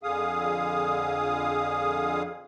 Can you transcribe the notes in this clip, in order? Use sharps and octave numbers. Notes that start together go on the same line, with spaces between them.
F2 D3 G#4 F5 D#6